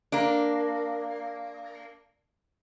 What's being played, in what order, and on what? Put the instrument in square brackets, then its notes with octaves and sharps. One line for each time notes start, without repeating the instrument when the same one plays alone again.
[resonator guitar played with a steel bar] A#3 D4